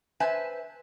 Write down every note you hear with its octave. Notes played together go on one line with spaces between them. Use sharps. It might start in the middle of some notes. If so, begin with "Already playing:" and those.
B4 C5 E5 G#5 A5